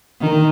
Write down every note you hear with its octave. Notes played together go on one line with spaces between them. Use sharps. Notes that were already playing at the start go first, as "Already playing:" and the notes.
D#3